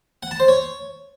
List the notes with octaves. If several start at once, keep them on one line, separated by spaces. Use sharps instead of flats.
F#5
A5
C5
C#5